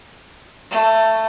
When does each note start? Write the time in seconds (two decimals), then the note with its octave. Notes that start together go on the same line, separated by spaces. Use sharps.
0.70 A3